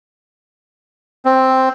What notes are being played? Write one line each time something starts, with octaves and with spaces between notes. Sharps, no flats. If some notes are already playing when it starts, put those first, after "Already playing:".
C4